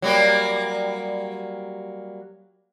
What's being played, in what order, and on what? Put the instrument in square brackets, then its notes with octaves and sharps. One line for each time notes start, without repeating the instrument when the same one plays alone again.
[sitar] F#3 G3 A#3